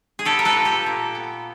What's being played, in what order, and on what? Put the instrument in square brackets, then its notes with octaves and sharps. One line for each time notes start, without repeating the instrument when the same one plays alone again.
[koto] G#4
B3 G4 A4
A#4
A4 B4
A#2
G4 A4
A#2
B3